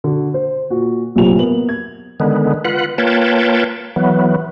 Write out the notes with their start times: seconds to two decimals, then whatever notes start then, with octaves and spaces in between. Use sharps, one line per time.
0.04 D3 F#4
0.34 C5
0.70 A#2 F#4
1.15 A#1 F#2 A2 C3 F7
1.38 A#3 B3 F#7
1.69 G#6
2.20 D3 D#3 G#3 B3
2.65 F4 B4 F#5
2.98 A#3 F4 B4 C#5 G5 A5
3.96 E3 F#3 B3